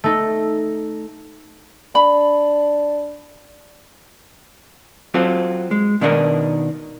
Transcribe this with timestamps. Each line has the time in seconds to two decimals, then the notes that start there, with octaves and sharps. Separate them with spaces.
0.04 A3 D#4
1.95 D4 B5
5.14 F#3 C4 F4 A4
5.71 G#3
6.01 B2 D#3 D4 D#4 G#4 A#4